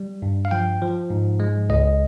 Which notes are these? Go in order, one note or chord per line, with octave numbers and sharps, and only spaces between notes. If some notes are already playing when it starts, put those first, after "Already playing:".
Already playing: G3
G2
F5
F3 G5
F3
G#2
G#3
C#2 D#5